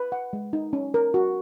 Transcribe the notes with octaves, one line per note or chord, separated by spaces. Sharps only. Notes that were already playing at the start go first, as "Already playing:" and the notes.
Already playing: B4
F#5
G#3
D#4
C#4
A#4
F#4